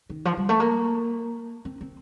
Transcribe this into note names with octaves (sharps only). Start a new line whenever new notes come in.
D#3
F3
G3
A3
A#3
C4
C4